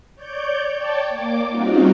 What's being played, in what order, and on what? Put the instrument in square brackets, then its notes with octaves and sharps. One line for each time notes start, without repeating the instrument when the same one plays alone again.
[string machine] C#5 D5 G6
C#5 D5 G5 A5
A#3 D6
G3 C4 C#4 D#4 F4 F#4